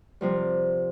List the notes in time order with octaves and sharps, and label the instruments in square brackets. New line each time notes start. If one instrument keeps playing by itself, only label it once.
[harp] C3 F3 G3